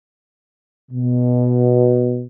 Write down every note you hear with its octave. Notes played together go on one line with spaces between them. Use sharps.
B2